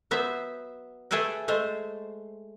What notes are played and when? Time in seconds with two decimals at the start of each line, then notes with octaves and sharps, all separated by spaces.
0.11 F#3 B3 C5 E5
1.11 A3 G#4 A4 B4 G5
1.48 G#3 A3 C5